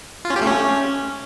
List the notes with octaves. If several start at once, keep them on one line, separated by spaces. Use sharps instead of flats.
F4
C#4
G4
A3
C#4